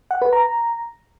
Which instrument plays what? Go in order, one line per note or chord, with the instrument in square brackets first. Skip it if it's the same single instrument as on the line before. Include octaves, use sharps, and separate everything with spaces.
[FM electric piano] F#5
B4
A#5